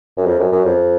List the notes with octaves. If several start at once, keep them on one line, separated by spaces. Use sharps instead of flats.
F#2
F2
F#2
F#2
F2